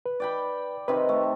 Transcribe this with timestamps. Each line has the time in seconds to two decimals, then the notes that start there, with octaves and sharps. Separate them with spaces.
0.06 B4
0.20 D5 G5 B5
0.88 C3 D#3 C4 B4
1.09 A3